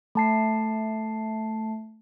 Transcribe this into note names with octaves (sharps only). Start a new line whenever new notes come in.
A3 A5 C7